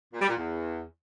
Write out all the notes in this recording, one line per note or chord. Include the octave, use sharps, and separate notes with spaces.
A#2
G3
A#2
E2